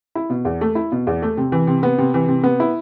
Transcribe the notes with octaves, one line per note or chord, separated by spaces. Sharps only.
E4
B2
E2
A3
E4
B2
E2
A3
C3
E3
C3
B3
C3
E3
C3
B3
E4